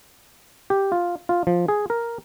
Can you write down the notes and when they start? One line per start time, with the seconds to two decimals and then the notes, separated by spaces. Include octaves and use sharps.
0.70 G4
0.92 F4
1.29 F4
1.47 F3
1.68 G#4
1.90 A#4